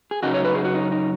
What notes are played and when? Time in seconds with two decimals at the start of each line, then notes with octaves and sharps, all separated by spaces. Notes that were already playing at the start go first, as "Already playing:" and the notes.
0.11 G#4
0.23 F#2 C#3 F#3 D#4 F#4
0.34 C#5
0.45 B4
0.55 G#4
0.65 F#4
0.75 D#4
0.92 D#4